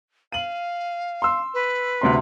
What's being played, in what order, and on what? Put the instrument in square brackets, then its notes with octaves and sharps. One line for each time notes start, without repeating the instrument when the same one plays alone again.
[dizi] F5 [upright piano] D#7 F#7
[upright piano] C6 E6
[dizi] B4
[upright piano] D2 C3 C6